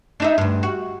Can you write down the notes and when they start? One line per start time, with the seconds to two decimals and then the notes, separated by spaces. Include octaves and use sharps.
0.20 D4 D#4 E5
0.38 D2 G2
0.63 F#4